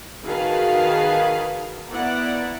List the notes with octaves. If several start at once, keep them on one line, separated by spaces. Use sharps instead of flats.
D#3 F#4 G#4 B4 F5 A5
B3 E4 D5 F#5 A#5